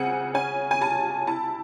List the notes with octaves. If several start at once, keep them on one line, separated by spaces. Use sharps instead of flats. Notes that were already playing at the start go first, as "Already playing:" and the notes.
Already playing: C#3 C4 F#5 G#5
C#4 G#5
G#5
C3 A5
E4 A5